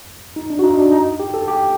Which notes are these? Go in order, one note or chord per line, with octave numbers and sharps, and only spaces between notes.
D#4
D4
F#4
D#4
D4
D#4
G4
A4
G4